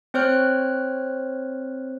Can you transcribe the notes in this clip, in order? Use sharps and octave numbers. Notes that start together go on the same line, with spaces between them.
C4 C5 C#5 F6 F#6